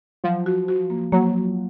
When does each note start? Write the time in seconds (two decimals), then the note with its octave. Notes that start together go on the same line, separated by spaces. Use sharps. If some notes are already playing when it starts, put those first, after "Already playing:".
0.24 F3 F#3
0.46 F#4
0.68 F#4
0.90 A#3
1.12 F#3 A#3